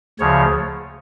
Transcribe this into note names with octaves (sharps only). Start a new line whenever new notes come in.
D2 C#3 F3 C#5